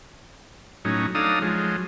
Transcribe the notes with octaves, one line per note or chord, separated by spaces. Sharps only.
A2 F#3 C#4 D#4
F#3 D4 D#4 A4 F5 D#6
F3 F#3 G#3